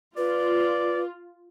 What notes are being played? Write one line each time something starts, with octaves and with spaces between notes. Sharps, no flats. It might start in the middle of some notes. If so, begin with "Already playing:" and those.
F4 B4 D5